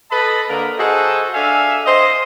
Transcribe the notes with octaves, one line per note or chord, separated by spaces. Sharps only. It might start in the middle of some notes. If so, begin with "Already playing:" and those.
A4 B4 D#5 A5 B5
D3 A#3 A#4
F#4 G#4 A4 C5 D#5
D4 A4 E5 F5 G#5
C5 D#5